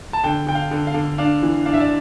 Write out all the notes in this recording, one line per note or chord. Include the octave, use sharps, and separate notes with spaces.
A5
D3 G5
D3 G5
F5
D3
F5
D3
D4 F5
E3
D4 F5
E5
D5